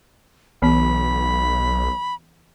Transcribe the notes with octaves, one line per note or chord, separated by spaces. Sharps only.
B1 E3 B3 B5